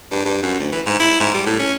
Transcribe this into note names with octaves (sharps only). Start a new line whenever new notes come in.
G2
G2
F#2
D2
E3
G#2
E4
G#2
G3
A2
C#4